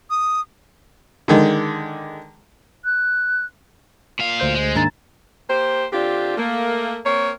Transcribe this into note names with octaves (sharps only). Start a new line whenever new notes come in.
D#6
D3 D#3 G#3
F#6
A#2 F5
D2 C5 G6
G#3
G#2 D#3 A#3 D4 A#5 A6
A#3 G4 C5
D3 C4 D4 F4 G4
A3 A#3
A#3 C4 A#4 C#5